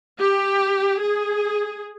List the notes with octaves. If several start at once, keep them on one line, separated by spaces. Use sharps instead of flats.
G4
G#4